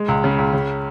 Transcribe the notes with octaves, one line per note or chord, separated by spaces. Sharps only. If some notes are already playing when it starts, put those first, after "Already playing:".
Already playing: G#3
C#2
C#3
C#2
C#3